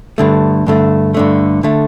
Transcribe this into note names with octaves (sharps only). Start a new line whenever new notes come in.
G2 D3 A3
G2 D3 A3
G2 D3 A3
D3 A3